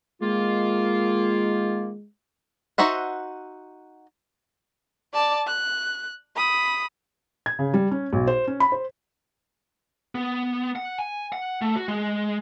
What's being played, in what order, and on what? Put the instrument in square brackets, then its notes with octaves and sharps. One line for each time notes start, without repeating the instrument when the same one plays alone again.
[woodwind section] D#3 A#3 F4 [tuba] G#3
[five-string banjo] D#4 F#4 C5 E5 F#5
[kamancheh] D5 A5
F#6
B5 D#6
[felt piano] G#6
C#3
G3
C#4
B1
C5
C#4
B5
C5
[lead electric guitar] B3
F#5
G#5
F#5
A3
F#4
G#3